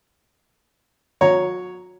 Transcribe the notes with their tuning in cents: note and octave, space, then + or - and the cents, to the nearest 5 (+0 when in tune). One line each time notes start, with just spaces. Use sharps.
F#3 -35 C#5 +0 A#5 +0